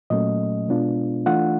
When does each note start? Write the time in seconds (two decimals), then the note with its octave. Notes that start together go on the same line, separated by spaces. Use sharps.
0.10 A#2 F#3 A3 C#4 D#5
0.69 B2 G#3 B3 D4 F4
1.26 E3 A3 D4 F4 F#5